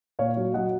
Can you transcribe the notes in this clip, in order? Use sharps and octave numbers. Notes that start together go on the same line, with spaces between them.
A#2 C#5 F5
F#3
F#3 D#5 F#5